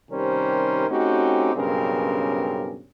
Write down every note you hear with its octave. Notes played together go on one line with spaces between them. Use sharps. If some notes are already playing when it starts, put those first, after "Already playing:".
C3 D#3 G3 C#4 A#4 C5
A3 C4 C#4 D#4 F#4 G4
B1 G2 C#3 C4 C#4 A#4